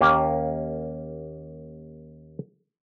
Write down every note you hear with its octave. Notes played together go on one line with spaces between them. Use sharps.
D#2 A#3 C#4 G4